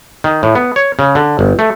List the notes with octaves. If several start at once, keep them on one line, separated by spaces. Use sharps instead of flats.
D#3
A2
B3
C#5
C#3
D3
G1
A3